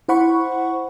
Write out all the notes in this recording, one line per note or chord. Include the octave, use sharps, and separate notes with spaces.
E4 C5 F#5 B5 C#6